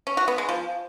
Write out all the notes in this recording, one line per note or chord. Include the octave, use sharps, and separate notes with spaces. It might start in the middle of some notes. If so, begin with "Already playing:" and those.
C#4
F#4
B3
G#3
F3